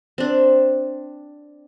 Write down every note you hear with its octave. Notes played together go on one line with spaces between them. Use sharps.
C4 D4